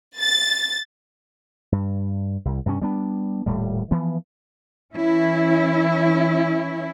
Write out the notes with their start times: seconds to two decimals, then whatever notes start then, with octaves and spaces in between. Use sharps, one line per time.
0.18 A6
1.72 G2
2.45 C2
2.66 G2 C3 G#3 C#4
2.82 G3 B3 D4
3.46 D#1 A2 G3
3.91 E3 F3 B3
4.95 E3 C#4 E4